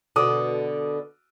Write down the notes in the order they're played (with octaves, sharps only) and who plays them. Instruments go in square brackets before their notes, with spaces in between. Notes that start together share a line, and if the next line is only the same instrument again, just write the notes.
[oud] B2 D3 [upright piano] F#4 D6 D#6